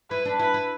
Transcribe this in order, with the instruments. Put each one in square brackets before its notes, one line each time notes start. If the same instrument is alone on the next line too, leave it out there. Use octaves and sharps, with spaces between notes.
[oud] E4 [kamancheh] B4
[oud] D4
[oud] E4 [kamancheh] B4
[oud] E4